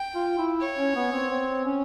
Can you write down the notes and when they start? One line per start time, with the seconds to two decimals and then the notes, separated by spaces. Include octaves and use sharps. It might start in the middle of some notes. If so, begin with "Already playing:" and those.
Already playing: G5
0.15 F4
0.38 E4
0.61 C#5
0.78 C#4
0.96 B3
1.12 C4
1.30 C4
1.65 C#4